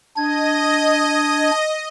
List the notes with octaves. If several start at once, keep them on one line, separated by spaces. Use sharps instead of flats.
D4 D#5 G#6